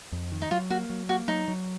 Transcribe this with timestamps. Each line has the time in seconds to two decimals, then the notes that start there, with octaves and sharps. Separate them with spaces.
0.12 F2
0.32 D#3
0.42 D#4
0.51 F#3 F4
0.70 A#3 F#4
0.90 F#3
1.09 A#3 F#4
1.28 F#3 D#4
1.48 F#3